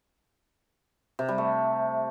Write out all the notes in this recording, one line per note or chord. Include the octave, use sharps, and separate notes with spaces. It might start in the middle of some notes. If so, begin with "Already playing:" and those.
C3
G3
A3